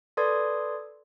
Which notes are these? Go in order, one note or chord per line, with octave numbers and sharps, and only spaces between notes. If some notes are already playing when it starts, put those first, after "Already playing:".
A4 B4 D5 C6 D#6 G#6